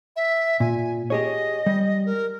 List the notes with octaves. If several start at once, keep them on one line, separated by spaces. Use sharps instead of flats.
E5
A#2 G#5
G4 G#4 C#5 D#5
G3
A#4